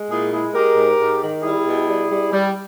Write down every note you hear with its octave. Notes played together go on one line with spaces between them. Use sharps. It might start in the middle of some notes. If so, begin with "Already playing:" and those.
Already playing: G#3
A#2 E4 G#4
G#3 E4 G#4
G#3 G4 A#4
G#2
G#2
D#3
G3 E4 G#4
B2
G3
G3
G3